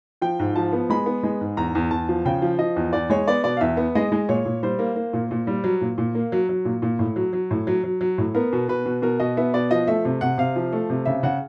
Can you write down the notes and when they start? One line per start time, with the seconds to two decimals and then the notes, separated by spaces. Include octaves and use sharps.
0.22 F3 G5
0.39 G#2
0.56 F3 A5
0.73 B3
0.90 G#3 B5
1.06 B3
1.23 G#3
1.41 G#2
1.57 E2 A#5
1.75 E2
1.91 E2 A5
2.09 F3
2.25 C#3 G5
2.42 F3
2.59 F3 D#5
2.76 E2
2.93 E2 D5
3.10 G#3 C#5
3.27 B3 D5
3.44 B2 D5
3.57 F5
3.61 E2 E5
3.77 B3
3.95 G#3 D#5
4.12 G#3
4.29 A#2 C#5
4.45 A#2
4.63 G3 C5
4.79 A#3
4.96 A#3
5.13 A#2
5.31 A#2
5.47 G3
5.64 F#3
5.81 A#2
5.98 A#2
6.15 A#3
6.32 F#3
6.49 F#3
6.65 A#2
6.82 A#2
6.99 A2
7.16 F#3
7.33 F#3
7.51 A2
7.67 F#3
7.84 F#3
8.01 F#3
8.18 A2
8.34 B3 A#4
8.53 B2
8.68 B2 B4
8.86 B2
9.02 B2 A#4
9.20 B2 D#5
9.37 B3 E5
9.54 B2 D5
9.71 F3 D#5
9.88 A3 E5
10.05 C3
10.21 C3 F#5
10.38 C3 F5
10.56 F3
10.73 A3
10.90 C3
11.05 C#3 E5
11.23 C#3 F#5